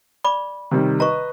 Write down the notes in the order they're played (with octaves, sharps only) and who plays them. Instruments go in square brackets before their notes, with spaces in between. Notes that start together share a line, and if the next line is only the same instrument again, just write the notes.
[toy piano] D5 B5 D6
[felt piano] C3 D#3 G3
[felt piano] B4 D#5 [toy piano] A#5 C#6